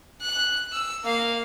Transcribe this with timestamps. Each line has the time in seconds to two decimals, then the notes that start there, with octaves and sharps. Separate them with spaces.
0.22 F#6
0.73 E6
1.04 A#3 F5